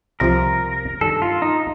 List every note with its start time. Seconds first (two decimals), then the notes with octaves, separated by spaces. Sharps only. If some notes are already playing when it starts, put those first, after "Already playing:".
0.20 C2 C3 F3 C4 F4 A#4
1.01 G2 D#3 G3 A4
1.22 F4
1.42 D#4